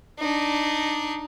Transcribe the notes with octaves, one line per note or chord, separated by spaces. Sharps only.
D4 D#4